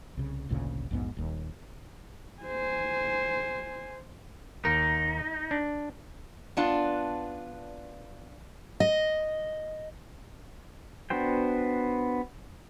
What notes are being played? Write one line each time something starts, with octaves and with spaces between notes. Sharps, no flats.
C2 C#3
G#1 D2 A#2 C#3
A#1 E2 G#2 B3
D#1 D#2
C5 G#5
D#2 D#4 A#4
D4
B3 D4 F4
D#5
B3 D4 F#4 C5 G5